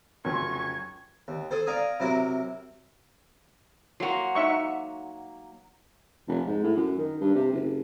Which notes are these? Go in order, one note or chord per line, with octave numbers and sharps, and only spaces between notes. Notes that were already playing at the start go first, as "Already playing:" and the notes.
F1 C#3 F#3 C#4 C6 C#6 G#6
D#2
G#4 A4 C5
D5 F5 G#5 A#5 D#6
C3 F#3 E4 A#4
F#3 A#3 F#4 C6
D#4 E5 C#6
F1
G#2
A2
F#2
D#3
G2
C3
F#1